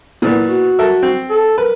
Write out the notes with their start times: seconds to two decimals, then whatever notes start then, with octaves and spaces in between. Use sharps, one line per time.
0.22 A#2 E3 B3
0.47 F#4
0.79 A4 A#4 E5
1.03 C4
1.30 A4
1.58 A#4 B4